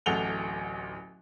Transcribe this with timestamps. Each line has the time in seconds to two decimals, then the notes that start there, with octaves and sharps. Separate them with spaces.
0.06 D1 A1 A4 F#5 F7 G7